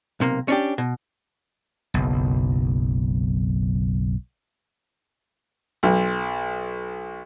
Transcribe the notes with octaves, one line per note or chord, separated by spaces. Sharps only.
B1 C3 A#3
C#4 D4 G4
B2
F#1 B1
B1